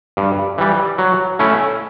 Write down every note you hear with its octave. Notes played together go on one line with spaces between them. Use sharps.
G2
E3 G3
F#3
A3 C#4 E4